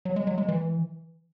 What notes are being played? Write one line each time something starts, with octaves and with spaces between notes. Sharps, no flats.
F#3
G#3
F#3
G#3
E3